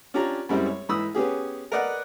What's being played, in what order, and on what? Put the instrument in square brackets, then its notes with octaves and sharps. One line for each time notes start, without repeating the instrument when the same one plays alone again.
[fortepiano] C#4 D4 F4 G4 C#5 A#5
F#2 G3 G#3 C4 E4
C#5
G#2 E3 B5 D#6 E6
B3 C#4 G4 G#4
A#4 B4 D5 D#5 F#5 F#6